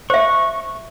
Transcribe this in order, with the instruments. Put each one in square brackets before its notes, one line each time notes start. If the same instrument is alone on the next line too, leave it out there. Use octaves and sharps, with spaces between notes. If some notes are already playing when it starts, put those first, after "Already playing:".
[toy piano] C5 E5 [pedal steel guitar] C#6